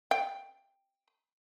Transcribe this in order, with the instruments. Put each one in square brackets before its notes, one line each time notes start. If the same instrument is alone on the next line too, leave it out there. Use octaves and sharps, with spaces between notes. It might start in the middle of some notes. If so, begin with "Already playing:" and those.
[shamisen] G5